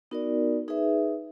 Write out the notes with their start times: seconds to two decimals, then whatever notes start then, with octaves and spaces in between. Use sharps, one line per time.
0.11 B3 D#4 F#4 A#4 D5
0.68 D#4 G#4 B4 E5